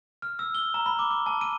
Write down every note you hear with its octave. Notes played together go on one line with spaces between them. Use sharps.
F6
E6
G7
A#5
B5
D6
D6
A5
D#7